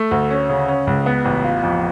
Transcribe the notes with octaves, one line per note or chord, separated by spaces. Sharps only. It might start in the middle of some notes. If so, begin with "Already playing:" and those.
Already playing: A3
D2
C#4
C#3
C#4
C#2
B3
A1
F4
F2